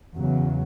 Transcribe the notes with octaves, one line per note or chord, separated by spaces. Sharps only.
E2 C#3 F#3